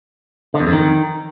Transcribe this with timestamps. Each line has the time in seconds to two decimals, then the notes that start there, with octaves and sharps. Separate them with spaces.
0.54 D3
0.60 E2
0.67 F2
0.73 D#3